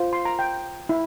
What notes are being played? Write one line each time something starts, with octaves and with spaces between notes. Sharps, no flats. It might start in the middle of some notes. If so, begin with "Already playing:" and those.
Already playing: F4 C5
C6
A#5
G5
E4